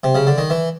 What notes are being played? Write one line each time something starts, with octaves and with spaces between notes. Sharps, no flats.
C3
C#3
D3
D#3
E3